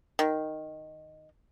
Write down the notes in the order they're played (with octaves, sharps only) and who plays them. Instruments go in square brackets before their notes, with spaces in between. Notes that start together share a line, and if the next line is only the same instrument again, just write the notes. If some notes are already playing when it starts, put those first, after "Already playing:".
[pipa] D#3